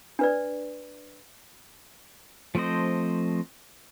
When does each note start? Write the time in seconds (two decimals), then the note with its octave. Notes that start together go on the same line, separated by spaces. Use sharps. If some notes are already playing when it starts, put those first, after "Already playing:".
0.19 D4 B4 D5
2.55 F3 A3 C4 C5 D#5